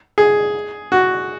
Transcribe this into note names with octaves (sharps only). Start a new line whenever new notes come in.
G#4
F#4